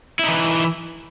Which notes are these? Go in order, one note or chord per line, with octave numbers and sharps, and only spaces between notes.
E3 D#4 E4